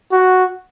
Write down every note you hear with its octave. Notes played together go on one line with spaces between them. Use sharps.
F#4